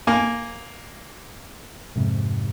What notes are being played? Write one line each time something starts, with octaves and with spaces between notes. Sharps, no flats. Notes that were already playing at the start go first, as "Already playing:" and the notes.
A#3 G#5
F2 G#2 C3